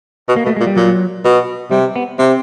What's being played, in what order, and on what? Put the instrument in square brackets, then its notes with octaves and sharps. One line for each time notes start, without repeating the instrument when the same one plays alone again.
[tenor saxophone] B2
[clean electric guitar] A#3
[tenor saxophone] B2 [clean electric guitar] A3
[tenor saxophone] A#2 [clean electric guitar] G#3
[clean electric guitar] G3
[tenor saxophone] A#2 [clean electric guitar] F#3
[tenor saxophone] B2
[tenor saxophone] C3 [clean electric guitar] G3
[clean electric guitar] B3
[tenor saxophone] C3 [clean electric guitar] C4